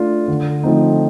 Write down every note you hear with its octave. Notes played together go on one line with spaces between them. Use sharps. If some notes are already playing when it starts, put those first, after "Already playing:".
Already playing: A3 D4 F4
D3
F3 A3 C4 D#4